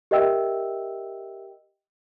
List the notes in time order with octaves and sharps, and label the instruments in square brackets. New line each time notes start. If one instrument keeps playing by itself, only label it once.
[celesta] G4 A#4 D#5 E5 G5 E6